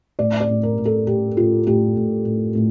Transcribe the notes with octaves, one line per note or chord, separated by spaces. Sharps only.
A2 D5
D5
A2
A#4
A2
A4
A2 G4
A2 F4
A2 G4
A2
A2
A2